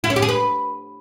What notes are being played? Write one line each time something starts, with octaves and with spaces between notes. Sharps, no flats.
E4
C#4
G4
G#4
B4